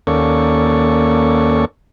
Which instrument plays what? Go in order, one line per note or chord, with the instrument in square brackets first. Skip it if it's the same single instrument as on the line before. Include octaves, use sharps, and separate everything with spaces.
[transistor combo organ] D#2 A#3 C#4 A4 D5 C#6